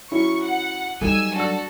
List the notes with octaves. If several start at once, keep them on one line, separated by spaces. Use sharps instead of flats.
F#3 C#4 E4 C#6
F#5
F#3 G3 D#4 G4 A4 G#5 E6
D4 F#4 A4 E6